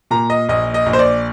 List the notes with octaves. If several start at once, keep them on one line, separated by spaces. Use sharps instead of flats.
A#2 A#5
D#5
A#1 D#5
D#5
A#1
C5
D5